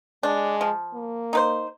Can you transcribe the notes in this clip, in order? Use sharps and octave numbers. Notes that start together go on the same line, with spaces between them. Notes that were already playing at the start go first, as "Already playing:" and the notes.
G#3 D4
F3
A#3
D#4 B4 C5